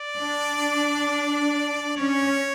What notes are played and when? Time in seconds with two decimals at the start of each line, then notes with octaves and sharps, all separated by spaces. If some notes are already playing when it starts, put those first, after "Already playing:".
Already playing: D5
0.17 D4
1.97 C#4 C#5